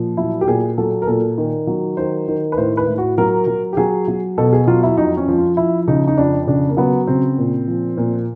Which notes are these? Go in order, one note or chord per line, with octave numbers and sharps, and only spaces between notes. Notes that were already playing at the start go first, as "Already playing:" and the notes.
Already playing: A#2 F3
F#3 E4
G4
A#2 G#4
F#3 A4
A#4
A#2 A4
D#3
F#3
D#3 C5
D#3
B4
A2 C5
B4
A2
F#4
F#3 A#4
F#3
G4
F#3 G#4
F#3
B2 A4
G#4
F#3 F4
E4
F2 D#4
C#4
F3
F4
F3 E4
C#3 D#4
D#4
F2 D4
C#3 D4
A#3
F#3 B3
C#3 C4
A#2
F3
A#2